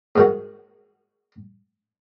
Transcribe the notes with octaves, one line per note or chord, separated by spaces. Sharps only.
G#2 D#3 F#4